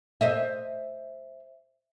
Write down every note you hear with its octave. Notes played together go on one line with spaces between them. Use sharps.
C5 D#5 E5